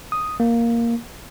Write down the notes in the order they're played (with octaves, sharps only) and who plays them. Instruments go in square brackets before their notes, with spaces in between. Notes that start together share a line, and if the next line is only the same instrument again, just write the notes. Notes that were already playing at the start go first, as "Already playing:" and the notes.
[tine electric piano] D#6
A#3